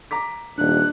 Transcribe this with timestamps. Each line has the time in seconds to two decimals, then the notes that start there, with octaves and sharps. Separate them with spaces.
0.11 A#5 D6 B6
0.58 D#1 D4 F#6